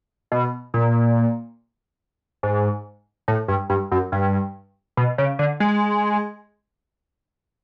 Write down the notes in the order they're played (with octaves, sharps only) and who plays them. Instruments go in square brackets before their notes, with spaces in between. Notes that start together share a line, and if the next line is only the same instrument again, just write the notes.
[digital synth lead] B2
A#2
G#2
A2
G2
G2
F#2
G2
B2
C#3
D3
G#3